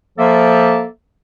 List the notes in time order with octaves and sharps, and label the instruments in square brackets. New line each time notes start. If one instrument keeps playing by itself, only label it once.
[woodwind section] F3 A#3 A4 E5